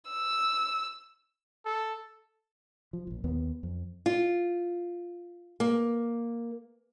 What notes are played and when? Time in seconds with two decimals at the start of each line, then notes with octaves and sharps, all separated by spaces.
0.10 E6
1.65 A4
2.93 F3
3.07 E1 A#1
3.24 D#2 B3
3.63 F2
4.06 F4
5.60 A#3